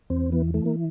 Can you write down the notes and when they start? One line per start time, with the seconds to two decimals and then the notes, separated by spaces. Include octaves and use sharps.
0.10 E2 C4
0.32 E3 B3
0.54 E3 A3
0.66 A#3